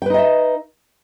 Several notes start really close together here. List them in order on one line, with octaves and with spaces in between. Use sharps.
G5 B4 D#4 D#5 E5